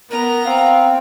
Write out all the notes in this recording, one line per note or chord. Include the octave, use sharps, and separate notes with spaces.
B3 A#4 A#5
C4 F5